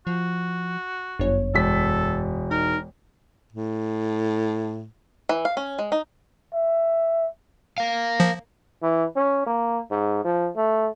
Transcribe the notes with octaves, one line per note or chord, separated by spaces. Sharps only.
F3 F#4
G1 F#2 C#5
E1 A4 B6
D#4 A#4
A2
E3
F5
C#4
G#3
D#4
E5
A#4 F5
F3
E3
C#4
A#3
G#2
F3
A3